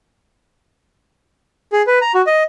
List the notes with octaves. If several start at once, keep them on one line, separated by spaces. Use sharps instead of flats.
G#4
B4
A#5
F#4
D#5